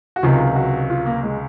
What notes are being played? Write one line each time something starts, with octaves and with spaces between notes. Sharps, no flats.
F#4
C#2 C3 D#3 F#3 F4
F#4
F4
A#3
G#3